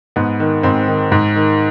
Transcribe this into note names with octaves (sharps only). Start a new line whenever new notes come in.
G#2 B3
D#3
G#2 C4
D#3
G#2
D#3